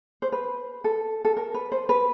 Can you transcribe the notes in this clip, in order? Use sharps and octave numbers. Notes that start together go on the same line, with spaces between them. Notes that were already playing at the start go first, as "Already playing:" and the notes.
C5
B4
A4
A4
A#4
B4
C5
B4